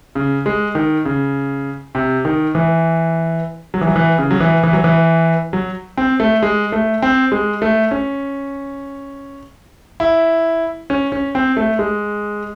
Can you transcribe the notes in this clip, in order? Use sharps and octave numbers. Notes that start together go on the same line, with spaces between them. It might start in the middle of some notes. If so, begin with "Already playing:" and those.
C#3
G#3
D#3
C#3
C3
D#3
E3
F#3
E3
F#3
E3
C#3
F#3
E3
E3
F#3
E3
F#3
C4
A3
G#3
A3
C4
G#3
A3
C#4
E4
C#4
C#4
C4
A3
G#3